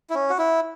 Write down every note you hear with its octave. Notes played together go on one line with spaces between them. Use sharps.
E4
C#4
F#4
E4